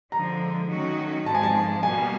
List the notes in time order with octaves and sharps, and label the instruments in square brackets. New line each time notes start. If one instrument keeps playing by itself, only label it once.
[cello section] D3 F3 G#3 [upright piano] A#5
[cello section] D#3 F#3 A3 C#4 F#4
[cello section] G#2 F3 G#3 [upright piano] A5
[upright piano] G#5
A5
[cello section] B2 G3 A#3 [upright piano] G#5